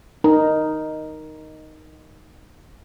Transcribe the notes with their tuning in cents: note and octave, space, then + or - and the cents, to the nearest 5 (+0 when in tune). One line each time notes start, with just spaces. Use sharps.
D#4 +0 A#4 +0